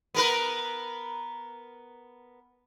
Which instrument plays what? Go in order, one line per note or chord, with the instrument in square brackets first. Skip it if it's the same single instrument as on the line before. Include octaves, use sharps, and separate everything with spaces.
[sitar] B3 A#4 B4